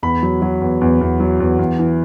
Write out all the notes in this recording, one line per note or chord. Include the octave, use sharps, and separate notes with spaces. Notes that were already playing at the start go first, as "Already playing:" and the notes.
E2 B5
F#3
F#3
E2
E2
E2
F#3
E2
E2
E3